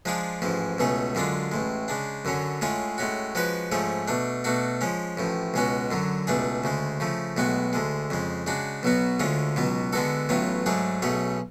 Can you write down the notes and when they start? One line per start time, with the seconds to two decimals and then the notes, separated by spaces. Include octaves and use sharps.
0.05 F3 G#3 D4 F4 G#4
0.42 A1 G#2 F3 G#3
0.78 C#2 B2 A3 C#4 G#4
1.15 F#2 D3 G#3 D4 F4
1.51 A1 A2 G#3
1.88 C#3 G#3 D4
2.25 F#2 D3 F#3 C#4
2.61 A2 G#3 C#4 F4 G#4
2.98 A2 G#3 C#4 F#4
3.35 F3 G#3 C#4 F#4 B4
3.72 G#2 F3 A3 C#4 G#4
4.08 B2 A3 D4
4.44 B2 A3 D4 F#4
4.81 F3 G#3 C#4
5.17 A1 A2 F3
5.54 C#2 B2 G#3 C#4 F#4
5.91 F#2 D3 F#3
6.27 C#2 B2 A3 D4 G#4
6.64 D2 C#3 G#3
7.00 C#3 F3 A3
7.37 B1 A2 G#3 B3 F#4
7.73 D2 D3 G#3
8.10 F2 C#3 G#3
8.46 C#3 G#3 D4 F#4
8.83 B1 B2 F#3 B3 F#4
9.20 D2 D3 G#3 C#4 F4
9.56 C#2 B2 F#3 B3
9.93 D3 G#3 B3 F#4 A4
10.29 A1 A2 F#3 B3 F4
10.66 G#2 F#3 A3 D4 G#4
11.02 B1 B2 A3 C#4 G#4